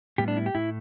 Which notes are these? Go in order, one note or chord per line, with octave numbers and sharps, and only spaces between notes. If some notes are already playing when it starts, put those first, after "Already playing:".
A2 G3 B3 G4
D4
E4
G4
A2 A3 E4